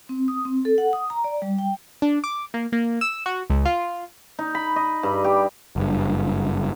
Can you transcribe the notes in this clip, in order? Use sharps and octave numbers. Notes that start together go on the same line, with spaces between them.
C4
D#6
C4
A4
F#5
D#6
A#5
D5
G3
G5
D4
D6
A#3
A#3
E6
F#4
C#2
F4
D#4
B5
D#5
G2
G4
F#1 G2